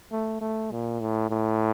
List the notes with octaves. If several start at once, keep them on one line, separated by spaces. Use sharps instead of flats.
A3
A3
A#2
A2
A2